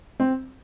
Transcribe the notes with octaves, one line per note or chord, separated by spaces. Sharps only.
C4